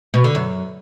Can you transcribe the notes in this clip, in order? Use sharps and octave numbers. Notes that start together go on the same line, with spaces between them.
B2
D3
F#2